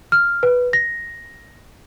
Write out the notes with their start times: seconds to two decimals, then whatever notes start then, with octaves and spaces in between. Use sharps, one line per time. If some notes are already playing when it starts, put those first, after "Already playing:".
0.12 F6
0.43 B4
0.73 A#6